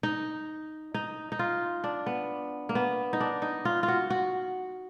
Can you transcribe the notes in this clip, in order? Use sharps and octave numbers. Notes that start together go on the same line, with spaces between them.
D#4
D#4
D#4
F4
D4
B3
A#3
B3
D#4
D4
D#4
F4
F4
F#4
F#4